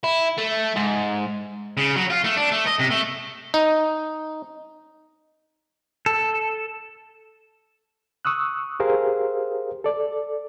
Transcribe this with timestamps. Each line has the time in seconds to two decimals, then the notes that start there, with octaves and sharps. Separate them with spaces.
0.04 E4
0.38 A3
0.76 G#2
1.77 C#3
1.96 F#3
2.10 F4
2.24 A3
2.37 D4
2.52 A3
2.67 D#5
2.79 C3
2.90 A3
3.54 D#4
6.06 A4
8.25 C#6 D#6 E6 F#6
8.80 G4 G#4 A#4 C5 F5
9.84 A4 D5